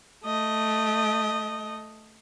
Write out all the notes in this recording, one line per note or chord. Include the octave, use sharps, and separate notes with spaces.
A3 D#5